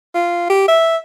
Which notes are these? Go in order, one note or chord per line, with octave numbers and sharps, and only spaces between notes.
F4
G4
E5